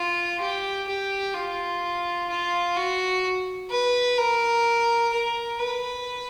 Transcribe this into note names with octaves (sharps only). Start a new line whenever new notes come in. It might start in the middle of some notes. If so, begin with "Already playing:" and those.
Already playing: F4
G4
G4
F4
F4
F#4
B4
A#4
A#4
B4